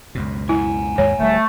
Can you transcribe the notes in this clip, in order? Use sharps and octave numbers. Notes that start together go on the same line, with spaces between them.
C#2 F#2 B2
E4 F#5 G#5
D#2 G#2 G#3 C#5
D1 G3 A3